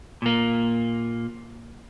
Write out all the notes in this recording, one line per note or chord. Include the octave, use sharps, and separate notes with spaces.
A#2 A#3